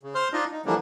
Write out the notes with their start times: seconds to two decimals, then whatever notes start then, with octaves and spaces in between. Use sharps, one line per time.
0.03 C#3
0.15 C5 C6 F6
0.33 D4 D#4 F4 D#5
0.52 D#4
0.66 D3 E3 F3 G3 A#3 D4